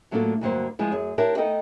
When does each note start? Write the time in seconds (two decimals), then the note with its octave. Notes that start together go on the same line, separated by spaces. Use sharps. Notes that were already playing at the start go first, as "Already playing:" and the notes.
0.11 A2 F#3 A#3 D4 F4 A4
0.41 D2 G2 D3 F#3 A#3 C5
0.79 F3 G#3 B3 E4
0.92 F#2 G#4 C#5
1.18 D4 E4 G4 A#4 C#5 E5
1.37 B3 D#4 A4 D#5 F#5 G5